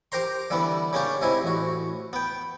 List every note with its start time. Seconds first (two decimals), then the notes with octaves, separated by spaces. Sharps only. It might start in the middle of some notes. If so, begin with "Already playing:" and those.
0.12 G4 A#4 C5 A#5 C6
0.50 D3 E3 G3 B3
0.93 C#3 A#3 C#4 D4 G4
1.21 G#2 C3 E4 G#4
1.43 A1 F#4
2.13 B3 G5